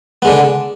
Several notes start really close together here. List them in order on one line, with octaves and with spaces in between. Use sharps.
B3 G#3 D3